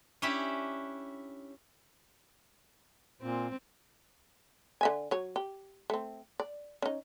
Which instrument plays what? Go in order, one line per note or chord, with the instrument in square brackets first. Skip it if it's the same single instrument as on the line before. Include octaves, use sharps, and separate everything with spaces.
[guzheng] C#4 D4 E4 G4
[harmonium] A#2 [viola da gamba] C4
[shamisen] D3 E5 G#5
F#3 C#5
G4
A3 C4
D5
C#4 D#4